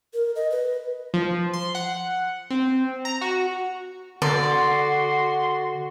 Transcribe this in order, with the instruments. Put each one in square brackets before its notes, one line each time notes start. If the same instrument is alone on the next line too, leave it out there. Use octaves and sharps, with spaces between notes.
[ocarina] A#4
D#5
B4
[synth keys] F3
C6
F#5
C4
A#5
F#4
[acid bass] D3 [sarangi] F#4 [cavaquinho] D5 [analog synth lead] C6